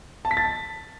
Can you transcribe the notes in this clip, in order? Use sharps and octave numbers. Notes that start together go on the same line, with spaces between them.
A5
B6
A6